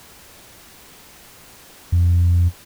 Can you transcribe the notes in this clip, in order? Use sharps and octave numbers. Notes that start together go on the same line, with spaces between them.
F2